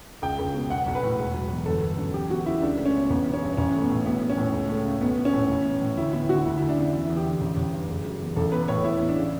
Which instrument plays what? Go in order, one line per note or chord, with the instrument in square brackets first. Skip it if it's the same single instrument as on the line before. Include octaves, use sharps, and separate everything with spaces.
[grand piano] C#2 G5
C#2
B2
B1 F#5
B1
B4
A2
E1
F#3
E2
G1 A4
G1
F#2
E2 G4
B3 F#4
C#3 E4
C#2 D4
A3
C#4
B2
A1 B3
B3
C#4
G2
A1 C#4
A3
B3
A2
B1 B3
B3
C#4
A2
C#2
A3
C#3
B1 B3
B3
C#4
A2
A1
B3
A2
D2 E4
B3 E4
D3 F#4
D2 E4
D2 E4
D4
C#3 E4
E2 E4
E2
G4
D3
A1
A1
G2
F#1
F#3
E2
A1 A4
B3 B4
B4
A2 C#5
E2 E4
B3
D4
C#3